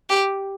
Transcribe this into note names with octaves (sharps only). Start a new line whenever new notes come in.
G4